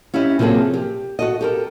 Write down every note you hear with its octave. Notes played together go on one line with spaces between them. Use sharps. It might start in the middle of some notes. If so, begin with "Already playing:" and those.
C#4 E4 G4 D#5 E5
C3 F3 F#3 A#3 G#4 A4
G4
F#4 A4 D#5
G4 A4 A#4